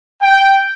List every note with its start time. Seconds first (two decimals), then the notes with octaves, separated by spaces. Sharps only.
0.22 G5